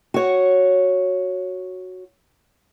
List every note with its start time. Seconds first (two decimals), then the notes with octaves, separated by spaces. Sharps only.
0.14 F#4 C#5